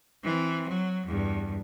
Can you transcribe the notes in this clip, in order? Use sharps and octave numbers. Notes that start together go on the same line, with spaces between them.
E3 C4
F#3
E2 G2